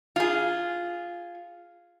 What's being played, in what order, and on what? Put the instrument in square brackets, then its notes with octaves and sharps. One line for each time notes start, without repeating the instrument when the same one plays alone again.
[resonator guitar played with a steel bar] F4 G#4